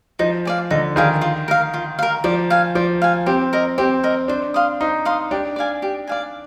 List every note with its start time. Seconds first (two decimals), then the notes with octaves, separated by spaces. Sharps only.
0.19 F3 D#4
0.45 G#4 D5 F5
0.71 D3 D#4
0.96 D#3 G#4 D5 F5
1.21 F4
1.48 A#4 F5
1.74 F4
1.99 A#4 F5
2.24 F3 D5
2.50 F5 G#5
2.75 F3 D5
3.02 F5 G#5
3.26 C4 G4
3.53 A#4 D#5
3.78 C4 G4
4.03 A#4 D#5
4.28 D4 C5
4.54 F5 C6 D#6
4.81 D#4 C5
5.05 F5 C6 D#6
5.31 D4 G4
5.56 D5 F5 G#5
5.82 G4
6.07 D5 F5 G#5